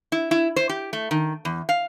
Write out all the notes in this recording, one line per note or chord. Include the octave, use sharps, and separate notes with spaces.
E4
E4
C5
G4
A3
D#3
E2
F5